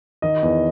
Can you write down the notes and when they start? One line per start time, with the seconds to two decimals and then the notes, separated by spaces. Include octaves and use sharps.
0.22 D#3 D#5
0.43 E2